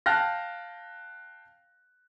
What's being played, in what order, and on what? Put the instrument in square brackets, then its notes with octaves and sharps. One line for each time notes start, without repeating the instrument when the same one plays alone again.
[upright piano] F5 G5 A5 F6 F#6 A#6